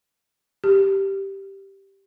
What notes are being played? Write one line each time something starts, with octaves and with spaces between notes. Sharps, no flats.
G4